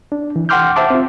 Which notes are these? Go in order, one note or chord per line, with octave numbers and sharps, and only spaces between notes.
D4
E3
F#5 G5 C6 D6 F6 G6
C5 E5 F#5 A5 D6
C4 F4